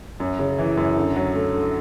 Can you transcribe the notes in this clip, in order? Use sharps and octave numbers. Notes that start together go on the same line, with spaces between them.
F#2
C#3
E3
F#2
D3
F#3
A3
D3